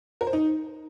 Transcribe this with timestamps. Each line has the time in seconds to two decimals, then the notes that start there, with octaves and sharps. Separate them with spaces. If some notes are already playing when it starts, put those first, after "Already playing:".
0.21 A#4
0.27 C5
0.33 D#4